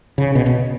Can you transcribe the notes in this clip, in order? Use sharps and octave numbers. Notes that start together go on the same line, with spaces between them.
C#3
B2
B2